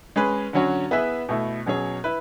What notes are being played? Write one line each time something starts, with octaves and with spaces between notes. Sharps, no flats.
G#3 C#4 G#4 B4
D3 F#3 C#4 F#4 C#5
B3 E4 G#4 B4 E5
B2 A3 E4
B2 F#3 C#4 G#4 C#5
E4 B4